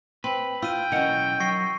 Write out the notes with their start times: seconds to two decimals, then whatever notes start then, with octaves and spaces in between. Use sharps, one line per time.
0.24 C4 B4 C6 F#7
0.62 F4 G5 E6 D#7
0.92 B1 D#3 E3 C#4 F#5
1.40 F#3 C#6 A#6 C7